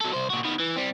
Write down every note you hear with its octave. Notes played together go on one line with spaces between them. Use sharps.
F#3 A4
C2 C5
A#2 F#4
D#3 B3
E3
G3 C4